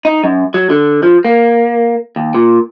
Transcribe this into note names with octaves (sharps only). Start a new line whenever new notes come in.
D#4
F#2
F#3
D3
F3
A#3
D#2
A#2